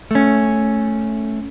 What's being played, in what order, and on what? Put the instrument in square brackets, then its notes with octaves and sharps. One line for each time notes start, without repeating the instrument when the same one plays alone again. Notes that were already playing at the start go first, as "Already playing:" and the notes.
[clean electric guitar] A3 C#4